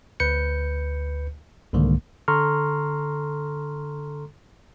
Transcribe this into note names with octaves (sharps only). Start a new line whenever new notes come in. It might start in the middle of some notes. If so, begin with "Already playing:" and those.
D2 B4 G6 C#7
C2 G#2 D3 D#3 G#3 A#3
D3 A4 A#5 C6 C#6 F6